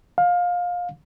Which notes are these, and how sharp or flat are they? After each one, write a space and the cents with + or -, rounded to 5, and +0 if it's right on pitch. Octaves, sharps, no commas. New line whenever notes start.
F5 +20